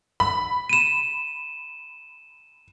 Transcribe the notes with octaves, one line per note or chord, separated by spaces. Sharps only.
B5
D#7 E7